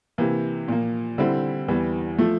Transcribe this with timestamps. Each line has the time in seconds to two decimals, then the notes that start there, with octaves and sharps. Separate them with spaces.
0.18 C3 E3 A#3
0.68 A#2 F3 A#3
1.18 D3 G3 C4 E4
1.68 E2 E3 G3
2.19 F3 A3